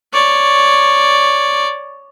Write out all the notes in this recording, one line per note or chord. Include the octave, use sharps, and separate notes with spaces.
C#5 D5